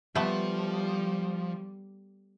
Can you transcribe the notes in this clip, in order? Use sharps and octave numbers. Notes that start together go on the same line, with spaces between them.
F3 G3 A3 B3